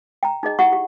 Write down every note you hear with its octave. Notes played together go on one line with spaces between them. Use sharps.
G5 A#5
D#4 G#4 D#5
E4 G4 F#5 C#6
G4